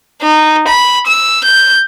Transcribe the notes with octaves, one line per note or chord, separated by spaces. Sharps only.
D#4
B5
E6
G6